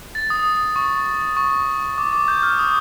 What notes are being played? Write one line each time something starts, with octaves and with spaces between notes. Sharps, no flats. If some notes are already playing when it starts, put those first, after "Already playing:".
A6
D#6
C#6
C#6
D6
D6
G6
F6
D#6